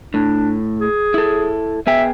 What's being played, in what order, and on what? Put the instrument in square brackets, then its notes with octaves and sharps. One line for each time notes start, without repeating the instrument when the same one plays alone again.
[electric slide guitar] A2 [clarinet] D4
[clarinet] G#4
[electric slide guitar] E4 A4
[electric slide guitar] B3 G#4 G5 [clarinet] E5